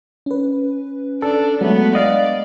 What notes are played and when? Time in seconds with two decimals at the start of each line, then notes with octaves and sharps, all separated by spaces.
0.26 C#4 B4
1.22 D4 A4
1.61 F#3 G#3 A3 B3 D4
1.95 D5 D#5 F5